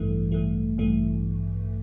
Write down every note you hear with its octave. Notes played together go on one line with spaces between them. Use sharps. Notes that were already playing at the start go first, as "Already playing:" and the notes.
Already playing: A1 G2 E3 A3
A1 G2 E3 A3
A1 G2 E3 A3